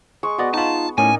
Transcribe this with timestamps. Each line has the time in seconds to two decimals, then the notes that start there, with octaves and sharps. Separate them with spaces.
0.23 G#3 C#6
0.39 B3 F#4 D5 D#5
0.54 D#4 F4 A5
0.98 A2 C#4 D#4 A#4 D5 G#5